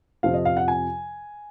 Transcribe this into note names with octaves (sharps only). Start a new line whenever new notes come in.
F2 C3 F3 F5
D#5
F5
F#5
G#5